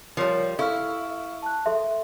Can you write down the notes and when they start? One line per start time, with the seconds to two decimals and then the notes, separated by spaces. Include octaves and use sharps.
0.17 F3 G3 A#4 C#5 C6
0.59 E4 A4 F5 C#6 F6
1.42 A5 F#6
1.66 A4 E5 C6